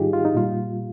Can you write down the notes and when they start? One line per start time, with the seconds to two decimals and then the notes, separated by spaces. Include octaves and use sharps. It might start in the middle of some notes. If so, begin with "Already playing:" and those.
Already playing: G#2 D#3 G3 D#4 F4 G4 G#4
0.13 F4
0.25 D#4
0.34 A#2 G3 F4